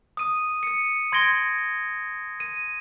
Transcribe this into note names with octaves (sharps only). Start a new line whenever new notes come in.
D#6 D#7
C#7 D#7
C6 G#6 A#6 D7 G7
D#7